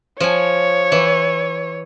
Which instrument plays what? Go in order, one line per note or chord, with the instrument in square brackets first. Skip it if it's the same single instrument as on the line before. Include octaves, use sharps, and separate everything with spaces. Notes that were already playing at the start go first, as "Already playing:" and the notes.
[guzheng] F3 G#5 [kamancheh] C#5
[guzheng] E3